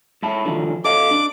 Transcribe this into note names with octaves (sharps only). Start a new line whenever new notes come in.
G#2 E4 A5
D3 D#3 F3
A4 D#5 F5 D6
D4